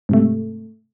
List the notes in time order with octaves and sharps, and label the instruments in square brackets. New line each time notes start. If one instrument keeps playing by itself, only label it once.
[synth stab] G#2 C3 A3